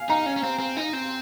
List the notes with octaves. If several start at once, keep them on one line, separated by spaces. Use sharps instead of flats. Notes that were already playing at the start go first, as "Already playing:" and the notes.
Already playing: F5 G#5
D#4 A#5
C#4
C#4
C4
C4
D#4
C4